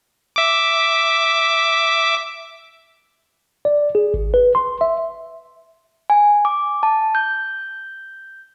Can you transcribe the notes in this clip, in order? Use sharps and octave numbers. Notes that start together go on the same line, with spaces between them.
E5 D6
D5
G#4
G#1
B4
C6
E5
G#5
D6
A5
G6